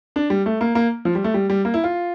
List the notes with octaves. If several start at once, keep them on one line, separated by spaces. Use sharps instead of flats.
D4
G3
A3
A#3
A#3
F3
G3
A3
G3
G3
A#3
E4
F4